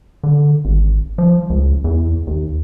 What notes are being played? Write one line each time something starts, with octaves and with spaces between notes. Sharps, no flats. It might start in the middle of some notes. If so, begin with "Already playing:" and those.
D3
G#1
F3
C#2
E2
D#2